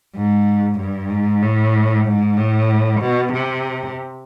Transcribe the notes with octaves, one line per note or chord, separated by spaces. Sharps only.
G#2
G2
G#2
A2
G#2
A2
B2
C3